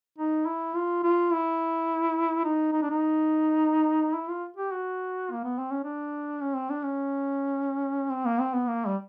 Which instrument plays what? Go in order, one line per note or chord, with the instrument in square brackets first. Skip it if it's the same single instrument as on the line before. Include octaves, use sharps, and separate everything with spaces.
[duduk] D#4
E4
F4
F4
E4
D#4
D#4
D4
D#4
E4
F4
G4
F#4
A#3
B3
C4
C#4
D4
C#4
C4
D4
C#4
C4
A#3
C4
B3
A#3
G3